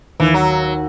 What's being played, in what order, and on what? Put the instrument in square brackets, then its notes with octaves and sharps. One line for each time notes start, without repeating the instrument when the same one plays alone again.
[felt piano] D#2 [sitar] E3
[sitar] F#3